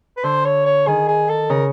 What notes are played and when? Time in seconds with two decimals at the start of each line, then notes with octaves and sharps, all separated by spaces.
0.17 B4
0.24 D3 C5
0.45 C#5
0.66 C#5
0.87 D#3 G#4
1.08 G#4
1.29 A4
1.50 C#3 A#4